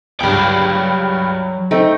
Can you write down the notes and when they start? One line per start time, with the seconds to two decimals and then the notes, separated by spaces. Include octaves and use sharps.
0.20 C#2 G2 F#3 G5
1.71 A3 C4 D#4